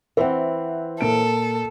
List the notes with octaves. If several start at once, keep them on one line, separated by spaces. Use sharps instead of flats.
E3 C4 C5 E5 F#5
A#2 A4 A#4 D7